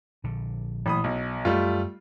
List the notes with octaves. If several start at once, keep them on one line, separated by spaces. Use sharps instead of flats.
A#1 D3
A1 A#2 E3 F#3 B5 D#6
B1 F#3
F#2 G3 A3 F4